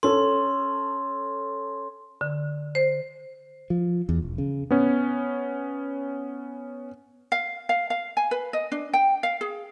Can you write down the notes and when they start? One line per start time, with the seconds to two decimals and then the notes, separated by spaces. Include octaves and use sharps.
0.03 C#4 A4 C6
2.21 D3
2.75 C5
3.70 F3
4.09 E2
4.22 E1
4.38 C#3
4.70 B3 C#4
7.32 F5
7.69 F5
7.90 F5
8.17 G#5
8.31 B4
8.53 D#5
8.72 D4
8.93 G5
9.23 F5
9.41 G#4